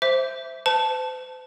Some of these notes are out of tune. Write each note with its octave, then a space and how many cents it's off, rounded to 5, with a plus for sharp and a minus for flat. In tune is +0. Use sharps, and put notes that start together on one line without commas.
C5 +0 E5 +0 D6 -20
C5 -45 A5 +0